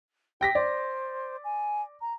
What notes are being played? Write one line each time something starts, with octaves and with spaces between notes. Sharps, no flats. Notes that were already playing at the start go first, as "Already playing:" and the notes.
G4 G5 A#6 B6
C5 D5
G#5
A#5